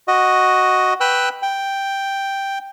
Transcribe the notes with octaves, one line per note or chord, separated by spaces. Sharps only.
F#4 D#5
B4 G5 E6 F#6
G5